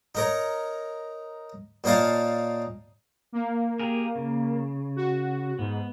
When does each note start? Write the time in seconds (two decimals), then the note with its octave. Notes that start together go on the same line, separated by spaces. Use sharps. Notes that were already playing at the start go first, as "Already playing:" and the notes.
0.15 D#4 A#4 C#5
1.84 A#2 D#4 C#5 F5 A5
3.33 A#3
3.79 G4 G#4 A#4
4.15 C#3
4.96 F#4
5.59 G#2 B3